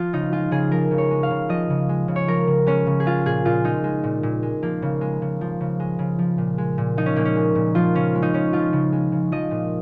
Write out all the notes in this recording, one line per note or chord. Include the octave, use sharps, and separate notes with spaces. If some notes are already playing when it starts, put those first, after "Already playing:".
Already playing: F3 F4
C#3 D#4
G#3 F4
C#3 G#4
F3 A#4
C#3
C#5
G#3
F5
C#3
F3 D#5
C#3
G#3
C#3
C#5
F3 A#4
C#3
G#3 C#4
C#3
G#4
G#3 F4
A#2 G#4
A#2 F4
G#3 D#4
G#3
A#2
A#2
G#3
F3 A#3
C#3
G#3
C#3
F3
C#3
G#3
C#3
F3
A#2
G#3
A#2
F3 D#4
C#4
A#2 A#3
C#4
G#3
A#2
F3 F4
C#3 C#4
G#3
D#4
C#3 C#4
F3 F4
C#3
G#3
C#3
F3 D#5
A#2